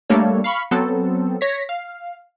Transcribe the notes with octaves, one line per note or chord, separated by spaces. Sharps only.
G3 A3 A#3 D4 A4 C#5
F5 B5 C#6
F#3 B3 C4 A4
C#5 A#6 B6
F5